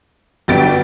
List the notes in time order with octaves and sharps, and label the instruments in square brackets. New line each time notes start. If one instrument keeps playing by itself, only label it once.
[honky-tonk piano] G1 A6 D7 [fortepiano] F#3 B3 G4